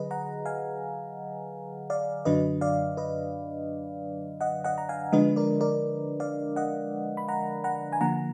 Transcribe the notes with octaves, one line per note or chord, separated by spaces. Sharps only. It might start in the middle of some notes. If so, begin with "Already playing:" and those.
Already playing: D3 F#3 G#4 B4 D#5
F#5 A#5
F5 G#5
D5 F5
F#2 D3 F#3 D4 B4 D#5
D5 F5
B4 D#5
D#5 F#5
D#5 F#5
A#5
F5 G#5
D3 F3 G#3 D4 B4 D#5
A#4 D5
A#4 D5
D5 F5
D#5 F#5
B5
F#5 A#5
F#5 A#5
G#5
D3 F3 A#3 F#5 A#5